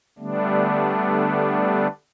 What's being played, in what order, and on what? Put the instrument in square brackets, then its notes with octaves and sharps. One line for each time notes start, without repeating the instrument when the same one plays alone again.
[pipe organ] D3 G3 A3 B3 D4